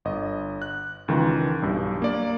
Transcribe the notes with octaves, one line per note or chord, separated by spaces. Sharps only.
G1 D#5
F#6
C#2 D#3 E3
B1 G2
A#3 D5